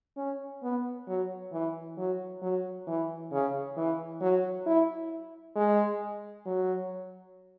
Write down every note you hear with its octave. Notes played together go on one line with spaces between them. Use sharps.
C#4
B3
F#3
E3
F#3
F#3
E3
C#3
E3
F#3
E4
G#3
F#3